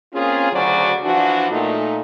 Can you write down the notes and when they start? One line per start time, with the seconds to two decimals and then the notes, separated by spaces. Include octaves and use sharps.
0.14 A#3 C4 C#4 F4 G#4
0.52 D2 C#3 F#3 F#4 C5 D5
1.04 E3 F3 D4 F#4
1.51 A#2 A3 D#4